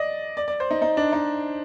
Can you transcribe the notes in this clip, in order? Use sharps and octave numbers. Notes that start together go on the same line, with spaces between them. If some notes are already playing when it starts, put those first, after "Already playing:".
Already playing: D5 D#5
D5
D5
C5
D#4
D#4
D4
D#4